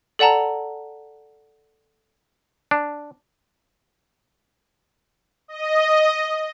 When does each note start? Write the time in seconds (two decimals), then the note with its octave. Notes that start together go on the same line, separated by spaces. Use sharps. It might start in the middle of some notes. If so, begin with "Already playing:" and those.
0.19 A4 D5 F#5 A5 A#5
2.71 D4
5.48 D#5